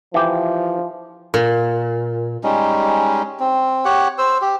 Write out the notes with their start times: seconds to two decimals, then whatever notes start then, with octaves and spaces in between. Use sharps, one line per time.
0.14 E3 F3 G4
1.34 A#2
2.44 G3 G#3 C#4 D#4
3.40 C4
3.85 G4 C#5 F#5
4.18 C5 E6
4.41 G4